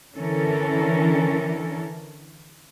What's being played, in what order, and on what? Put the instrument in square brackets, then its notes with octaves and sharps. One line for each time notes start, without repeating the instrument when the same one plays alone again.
[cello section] D3 E3 C#4 A4 A#4